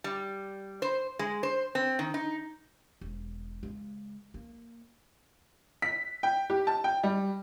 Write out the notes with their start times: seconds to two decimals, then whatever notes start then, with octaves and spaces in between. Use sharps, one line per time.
0.04 G3
0.82 C5
1.19 G#3
1.43 C5
1.75 C4
1.99 D#3
2.14 D#4
3.01 E1
3.63 C#3 G#3
4.34 A#3
5.82 B6
6.23 G5
6.50 G4
6.67 A5
6.84 G5
7.03 G3